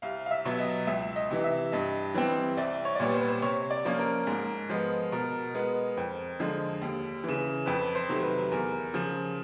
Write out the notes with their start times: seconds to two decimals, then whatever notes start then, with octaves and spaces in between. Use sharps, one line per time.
0.02 C2 F5
0.26 F5
0.31 E5
0.45 B2 F#3 B3
0.60 D#5
0.87 C#2 E5
1.16 D#5
1.30 C3 E3
1.44 E5
1.72 G2 D#5
2.14 E3 G3 C4
2.57 C2 D5
2.85 C#5
2.95 D5
3.00 A#2 G3 B3 C#5
3.14 C5
3.21 B4
3.28 C5
3.42 C3 C#5
3.71 D5
3.85 F3 A#3 C#4
3.99 A#4
4.27 G#2
4.69 F3 G#3 B3
5.12 B2 A#4
5.55 G#3 B3
5.97 F2
6.40 D3 F3 G#3
6.82 D#2
7.24 C#3 E3
7.66 F2 B4
7.95 C5
8.09 C3 D#3 F#3 A3
8.23 B4
8.51 E2 A#4
8.94 C#3 F3